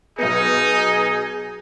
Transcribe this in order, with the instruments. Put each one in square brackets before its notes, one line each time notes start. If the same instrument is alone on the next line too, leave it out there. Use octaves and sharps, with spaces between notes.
[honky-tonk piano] B1 B3 [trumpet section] D#4 [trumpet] G#4